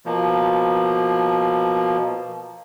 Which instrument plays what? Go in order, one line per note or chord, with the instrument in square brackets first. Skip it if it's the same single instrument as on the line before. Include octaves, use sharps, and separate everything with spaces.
[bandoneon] B2 F3 A#3